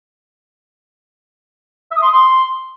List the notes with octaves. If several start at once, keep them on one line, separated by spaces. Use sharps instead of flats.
E5
D#6
C6
D#6
C6